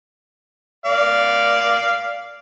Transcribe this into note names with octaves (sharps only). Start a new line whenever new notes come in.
D5 F5